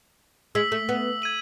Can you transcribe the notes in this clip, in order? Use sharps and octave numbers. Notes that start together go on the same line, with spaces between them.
G#3 E6 B6 F#7
A3
B3
G#6 D#7 F#7